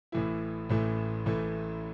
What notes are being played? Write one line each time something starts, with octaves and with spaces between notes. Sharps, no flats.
A1 A2 E3 A3 E4
A1 A2 E3 A3 E4
A1 A2 E3 A3 E4